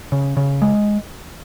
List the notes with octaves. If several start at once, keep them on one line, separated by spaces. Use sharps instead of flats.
C#3
C#3
G#3